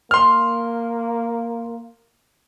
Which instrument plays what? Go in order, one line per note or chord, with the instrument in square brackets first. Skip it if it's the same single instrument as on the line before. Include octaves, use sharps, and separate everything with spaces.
[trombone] A#3 [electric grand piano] C6 F6